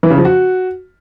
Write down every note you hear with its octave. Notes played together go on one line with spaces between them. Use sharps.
E3
C#3
F3
F#4